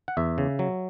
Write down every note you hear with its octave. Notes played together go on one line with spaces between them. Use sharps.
F#5
E2 E5
C#3
F#3